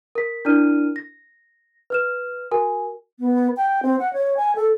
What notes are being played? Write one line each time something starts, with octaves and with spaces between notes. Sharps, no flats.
A#4 B6
D4 E4 A#4 D5 F6 D#7
A#6
B4 F6 E7
F#4 A#4 G#5
B3
G5
C4
F#5
C#5
G#5
A4